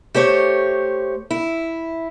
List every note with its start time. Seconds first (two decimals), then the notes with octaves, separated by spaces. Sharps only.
0.14 A3 G4 C5 C#5
1.31 E4